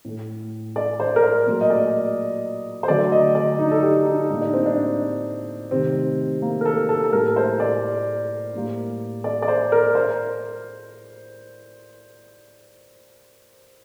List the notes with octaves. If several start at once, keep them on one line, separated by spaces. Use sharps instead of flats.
A2 A3
D5
C5
A#4
C5
A#2 F#3 A3
D#5
D5
C5
D3 F#3 A3 D5
D#5
D5
D#4
A4
G4
D#4
A2 G3 A#3 D#4
D4
C4
D4
C3 D#3 A3 C4
A#3
A#4
A4
A4
A4
A2 G3 A#3 A#4
C5
D5
A2 G3 A#3
D5
D5
C5
A#4
C5